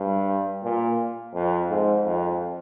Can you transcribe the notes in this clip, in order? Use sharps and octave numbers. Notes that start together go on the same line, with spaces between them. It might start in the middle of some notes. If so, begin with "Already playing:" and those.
Already playing: G2
A#2
F2
G#2
F2